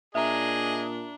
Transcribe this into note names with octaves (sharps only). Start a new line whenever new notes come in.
A#2 D4 G#4 D#5 E5 A#5